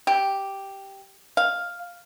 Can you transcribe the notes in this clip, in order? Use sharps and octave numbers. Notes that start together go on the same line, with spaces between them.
G4
F5